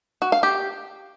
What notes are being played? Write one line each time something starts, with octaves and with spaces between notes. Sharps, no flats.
F#4
F5
G4